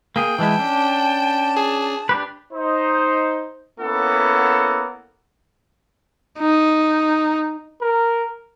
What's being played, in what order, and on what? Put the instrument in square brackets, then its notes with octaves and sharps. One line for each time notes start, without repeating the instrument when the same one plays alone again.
[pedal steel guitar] A#3 G#4 [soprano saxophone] G5
[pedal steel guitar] E3 G#3 E4 [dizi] A5
[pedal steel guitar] C#4 D4
[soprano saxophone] G#4
[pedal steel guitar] D4 G4 B4
[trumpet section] D#4 C5
A#3 B3 C#4 E4 A4 F#5
[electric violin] D#4
[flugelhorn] A#4